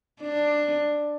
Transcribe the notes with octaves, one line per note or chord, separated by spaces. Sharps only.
D4